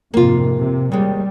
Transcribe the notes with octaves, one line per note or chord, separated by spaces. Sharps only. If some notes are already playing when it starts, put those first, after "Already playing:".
F2 G#2 C3 A#3 F4
C3
D#2 G3 G#3